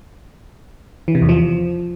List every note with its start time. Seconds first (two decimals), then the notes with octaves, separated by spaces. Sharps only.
1.08 E3
1.15 C3
1.22 E2
1.29 F3